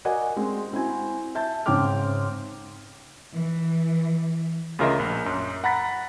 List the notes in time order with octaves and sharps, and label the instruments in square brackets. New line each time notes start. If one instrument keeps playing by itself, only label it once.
[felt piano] F#4 A#4 D5 D#5 F#5 G#5
G#3 C4
C4 E4 F#4 G#5
E5 A5 G6
G#2 C#3 C4 G5 D6 F6
[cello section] E3
[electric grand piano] D2 C#3 F4 A#4 D#5 E5
A#1
F#2
F#5 A#5 B5 A6 B6